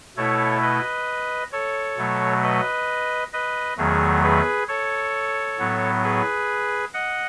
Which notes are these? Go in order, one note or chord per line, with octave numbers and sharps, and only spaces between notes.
B2 A3 E4 A4 C#5
B4 D#5
A4 C#5
B2 F#3 A3
B4 D#5
B4 D#5
E2 D#3 F#3 A3 G#4
G#4 B4
A4 C#5
A2 F#3 B3
G#4 B4
D#5 F#5